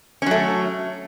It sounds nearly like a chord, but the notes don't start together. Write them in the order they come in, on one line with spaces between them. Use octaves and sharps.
C#4 F#3 A3